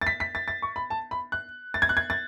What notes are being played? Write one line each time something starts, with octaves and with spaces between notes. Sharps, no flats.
A6
B6
B6
A6
A6
C#6
B5
A5
B5
F#6
A6
G#6
F#6
G#6
A6